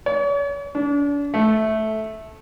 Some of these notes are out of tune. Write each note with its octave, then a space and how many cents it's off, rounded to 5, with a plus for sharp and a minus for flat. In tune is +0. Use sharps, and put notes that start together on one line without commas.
C#5 +40
D4 -40
A3 -10